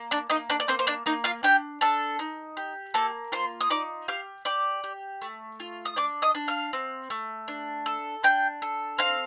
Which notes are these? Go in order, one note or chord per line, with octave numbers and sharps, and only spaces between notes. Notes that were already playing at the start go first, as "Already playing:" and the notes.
Already playing: A#3
D4 D5
A#3 D#4 D#5
D4 D5
D5
A#3 C4 C5
C5
D4 D5
A#3 D#4 D#5
F4 F5
D4 G4 G5
D4 A4 A5
D#4
G4
A#3 A4 A5
F4 C5 C6
D#6
D#4 D5 D6
G4 F5 F6
G4 D5 D6
G4
A3
F4
D#6
D4 D5 D6
D#5 D#6
D4
F5 F6
C4
A3
D4
A4
D4 G5 G6
A4
C4 F5 F6